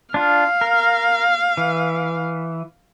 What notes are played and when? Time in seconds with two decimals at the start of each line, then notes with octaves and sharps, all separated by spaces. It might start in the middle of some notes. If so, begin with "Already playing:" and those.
0.14 D4 F4 F5
0.61 A#4
1.57 E3